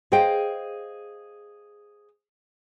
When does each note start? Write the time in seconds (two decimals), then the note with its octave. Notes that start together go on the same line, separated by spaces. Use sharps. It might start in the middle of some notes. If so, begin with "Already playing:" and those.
0.12 G#4 C5 D#5 F5 G5